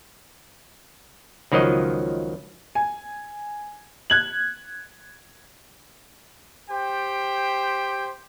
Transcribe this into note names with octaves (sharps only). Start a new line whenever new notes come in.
C#2 D#3 F3 F#3 D#5
G#5
F#6 G#6 F#7
G4 C5 G5